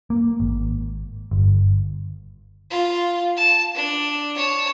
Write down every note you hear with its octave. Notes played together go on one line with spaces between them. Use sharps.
A#3
G#1
G1
F4
A5
D4
C#5 A5